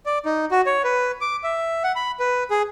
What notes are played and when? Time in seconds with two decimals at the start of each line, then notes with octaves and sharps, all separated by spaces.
0.06 D5
0.25 D#4
0.51 F#4
0.66 C#5
0.84 B4
1.21 D6
1.44 E5
1.84 F#5
1.96 B5
2.20 B4
2.51 G#4